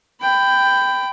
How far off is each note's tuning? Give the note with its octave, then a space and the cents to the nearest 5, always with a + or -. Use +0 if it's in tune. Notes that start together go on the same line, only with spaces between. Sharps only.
G5 +0 B5 +25